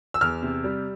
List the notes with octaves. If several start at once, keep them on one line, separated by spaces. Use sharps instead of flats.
E6
E2 F6
C3
G3